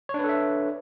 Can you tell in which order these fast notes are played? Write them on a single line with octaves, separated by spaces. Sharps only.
C#5 D4 B4 A4 E5